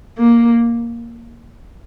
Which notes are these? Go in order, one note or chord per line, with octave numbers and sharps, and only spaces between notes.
A#3